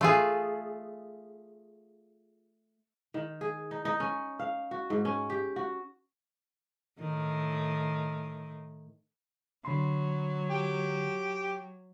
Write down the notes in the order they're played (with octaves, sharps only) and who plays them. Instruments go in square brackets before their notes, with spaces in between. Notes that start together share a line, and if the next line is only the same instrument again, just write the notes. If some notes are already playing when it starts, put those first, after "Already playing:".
[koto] A3 F4 G#4
[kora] D#3
G#4
D#4
D#4
C#4
F5
F#4
G#2
C#4
G4
F#4
[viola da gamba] A2 D#3
[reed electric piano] D3 B5 C6 [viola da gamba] F#3
[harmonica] G4